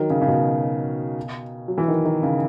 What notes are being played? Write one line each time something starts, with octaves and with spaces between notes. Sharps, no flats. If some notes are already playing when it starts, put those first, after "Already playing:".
Already playing: D#3 F#3
C#3
C#3
B2
F#3
E3
D#3
D#3
C#3